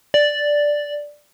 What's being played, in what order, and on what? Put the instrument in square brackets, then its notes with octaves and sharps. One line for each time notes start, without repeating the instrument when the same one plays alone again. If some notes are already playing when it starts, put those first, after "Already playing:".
[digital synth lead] D5